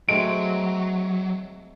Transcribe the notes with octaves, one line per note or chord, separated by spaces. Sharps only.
F#3 G#3 A3 C4 D7